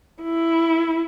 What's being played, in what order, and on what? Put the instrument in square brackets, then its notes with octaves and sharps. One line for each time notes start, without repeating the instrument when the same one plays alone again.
[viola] E4